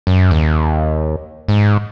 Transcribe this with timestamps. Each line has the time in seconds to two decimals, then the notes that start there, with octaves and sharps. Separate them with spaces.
0.07 F#2
0.31 D#2
1.48 G#2